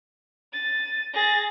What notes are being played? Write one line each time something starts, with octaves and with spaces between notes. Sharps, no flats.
A6 D#7
G#4 A6 A#6